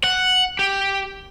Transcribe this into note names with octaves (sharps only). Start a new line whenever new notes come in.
F#5
G4